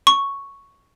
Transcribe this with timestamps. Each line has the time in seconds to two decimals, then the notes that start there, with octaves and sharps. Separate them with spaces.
0.07 C#6